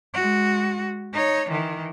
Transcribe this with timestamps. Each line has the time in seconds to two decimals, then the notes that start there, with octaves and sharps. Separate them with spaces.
0.14 G#3 F#4
1.13 D#4 C#5
1.49 D#3 E3